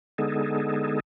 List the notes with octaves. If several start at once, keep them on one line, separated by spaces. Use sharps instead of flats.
D3 G#3 B3 D#4 G#4 A4